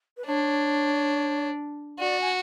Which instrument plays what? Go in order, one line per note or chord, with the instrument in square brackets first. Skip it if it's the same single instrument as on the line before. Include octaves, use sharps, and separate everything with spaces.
[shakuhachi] B4
[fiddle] D4 [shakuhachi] C#5
[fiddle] F#4 [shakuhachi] D5
[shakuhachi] G#5